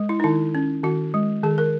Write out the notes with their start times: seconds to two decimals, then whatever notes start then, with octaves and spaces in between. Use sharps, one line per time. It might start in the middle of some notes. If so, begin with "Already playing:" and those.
Already playing: G#3
0.09 E4
0.20 D#4
0.24 D#3 E4
0.55 C#4
0.83 D#3 F#4
1.14 G#3
1.43 D#3 G#4
1.58 A#4